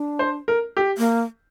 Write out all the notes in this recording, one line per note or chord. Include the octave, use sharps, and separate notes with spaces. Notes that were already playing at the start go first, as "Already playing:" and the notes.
Already playing: D4
C5
A#4
G4
A#3